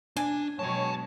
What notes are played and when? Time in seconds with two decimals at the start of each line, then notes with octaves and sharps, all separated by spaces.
0.17 D4 G#5
0.59 B2 F#3 G#3 C#5 G5 A5